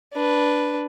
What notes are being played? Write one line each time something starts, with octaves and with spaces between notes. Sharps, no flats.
D4 B4